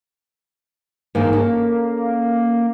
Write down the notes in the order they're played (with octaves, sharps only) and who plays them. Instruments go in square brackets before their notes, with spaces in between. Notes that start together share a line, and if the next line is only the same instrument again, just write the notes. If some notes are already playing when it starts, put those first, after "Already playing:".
[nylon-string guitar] G#2 D#3 [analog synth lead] A#3
[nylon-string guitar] C#4 A4